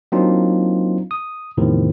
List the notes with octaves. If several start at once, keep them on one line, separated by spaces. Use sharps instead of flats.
F#3 A#3 C4 D4 D#4 F4
D#6
E2 A2 C3 D#3 F3